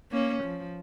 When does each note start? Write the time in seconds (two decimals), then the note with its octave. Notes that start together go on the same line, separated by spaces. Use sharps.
0.11 A#3 C#4
0.43 F3